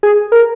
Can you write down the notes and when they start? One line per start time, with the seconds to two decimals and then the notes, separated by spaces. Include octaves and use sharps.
0.03 G#4
0.32 A#4